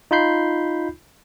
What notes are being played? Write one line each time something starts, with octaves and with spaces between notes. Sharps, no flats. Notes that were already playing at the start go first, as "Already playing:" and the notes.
D#4 F4 B5 G6 C7